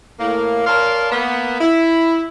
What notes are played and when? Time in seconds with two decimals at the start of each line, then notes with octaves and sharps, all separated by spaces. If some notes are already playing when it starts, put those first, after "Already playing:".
0.20 A2 A#3
0.67 A#4 C#5 D5 F5 A5 C6
1.12 A#3 B3
1.61 E4